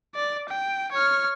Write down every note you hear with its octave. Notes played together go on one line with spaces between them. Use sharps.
D5
G5
C#5 F6